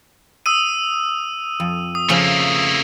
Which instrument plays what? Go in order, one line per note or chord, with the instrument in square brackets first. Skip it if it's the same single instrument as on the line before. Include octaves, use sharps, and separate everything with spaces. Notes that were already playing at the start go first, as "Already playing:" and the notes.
[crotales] D#6 E6 D#7
[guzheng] F2
[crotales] D#6
[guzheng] C#3 F3 C#4 [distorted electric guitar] A3 A#3